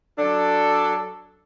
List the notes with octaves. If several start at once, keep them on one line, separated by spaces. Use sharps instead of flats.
F#3 D4 A4